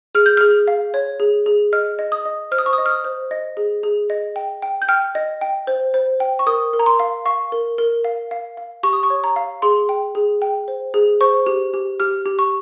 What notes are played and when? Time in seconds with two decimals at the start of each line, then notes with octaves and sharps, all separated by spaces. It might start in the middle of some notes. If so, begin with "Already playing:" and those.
0.15 G#4 F6
0.26 G6
0.37 G#4 F6
0.67 F5
0.94 C#5
1.20 G#4
1.46 G#4
1.73 D#5 F6
1.99 D#5
2.12 D#6
2.25 D#5
2.52 C5 F6
2.58 D#6
2.66 C#6
2.73 D#6
2.78 D#5
2.86 F6
2.91 D#6
3.05 C5
3.31 D#5
3.57 G#4
3.83 G#4
4.10 D#5
4.36 G5
4.62 G5
4.82 G6
4.89 G5 F6
5.15 D#5
5.41 G5
5.67 C5
5.94 C5
6.20 G5
6.39 C#6
6.46 A#4 D#6
6.73 A#4
6.79 A#5
6.86 C6
7.00 F5
7.25 F5 C#6
7.52 A#4
7.78 A#4
8.04 F5
8.31 F5
8.57 F5
8.83 G4 C#6
8.93 D#6
9.03 C#6
9.10 C#5
9.24 A#5
9.36 F5
9.62 G#4 C6
9.89 G5
10.15 G#4
10.42 G5
10.68 C5
10.94 G#4
11.21 C5 C#6
11.47 G4
11.74 G4
12.00 G4 F6
12.26 G4
12.39 C#6